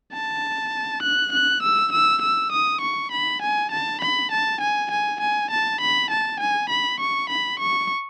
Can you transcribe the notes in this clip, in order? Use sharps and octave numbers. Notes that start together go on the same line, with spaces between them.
A5
F#6
F#6
E6
E6
E6
D#6
C#6
B5
G#5
A5
B5
A5
G#5
G#5
G#5
A5
B5
A5
G#5
B5
C#6
B5
C#6